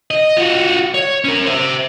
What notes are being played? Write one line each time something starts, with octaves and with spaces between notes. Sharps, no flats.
D#5
F4 F#4
C#5
C#4 A#4
C5 E5